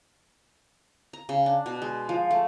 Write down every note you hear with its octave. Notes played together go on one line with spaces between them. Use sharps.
A#5
C#3
D4
B2
G#3
F3
A3